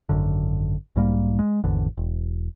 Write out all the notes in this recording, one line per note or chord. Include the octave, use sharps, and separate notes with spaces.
G#1 F#2 D3
B1 G#2 G3 A#3
G#3
G#1 E2 D3
E1